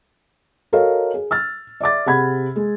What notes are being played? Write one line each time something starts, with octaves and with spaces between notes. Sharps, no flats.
F#4 A4 A#4 C#5 D#5 F5
G#4
E6 F6 A6
D5 E5 D6 A6
C3 G#4 F#5 B5 G#6
G#3